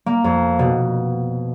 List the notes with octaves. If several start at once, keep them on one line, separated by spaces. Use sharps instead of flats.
A#3
F2
B2